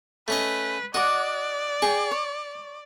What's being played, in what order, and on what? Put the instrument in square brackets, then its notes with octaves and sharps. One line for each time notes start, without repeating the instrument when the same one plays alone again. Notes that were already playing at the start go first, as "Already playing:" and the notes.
[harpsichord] A3 C#4 D#5 [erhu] B4
[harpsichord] F#4 [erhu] D5 [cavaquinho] D#5 F#5 D6
[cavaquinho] G#4 G5 [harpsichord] C#6
[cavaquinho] C#5